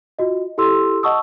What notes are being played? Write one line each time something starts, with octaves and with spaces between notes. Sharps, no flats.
F4 F#4 D#5
E4 G4 A4 C6 E6
D#5 F#5 A5 C#6 D#6 E6